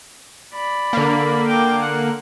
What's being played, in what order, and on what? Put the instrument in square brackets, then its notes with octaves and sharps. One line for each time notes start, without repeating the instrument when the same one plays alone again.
[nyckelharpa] D5 B5
[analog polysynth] D3 A#3
[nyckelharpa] G5 D6
F#5